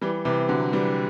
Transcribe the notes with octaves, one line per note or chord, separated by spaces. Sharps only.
E3 G3
C3 E3
D3 F#3
E3 G3